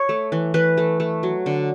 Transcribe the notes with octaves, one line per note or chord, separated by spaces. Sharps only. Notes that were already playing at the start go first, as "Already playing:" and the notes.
Already playing: C#5
A3
E3
E3 B4
A3
A3
F#3
D3